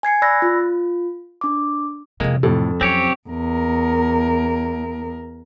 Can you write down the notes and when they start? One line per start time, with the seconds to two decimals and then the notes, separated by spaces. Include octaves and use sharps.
0.03 G#5 G#6 C7 C#7
0.22 D5 B5 E6 F#6 A6 A#6
0.42 F4
1.41 D4 D6
2.20 F2 C3 E3 G#3 A#3
2.43 F2 A2 A4
2.81 F#3 C4 C#4 G4 C#5
3.29 E2 A#4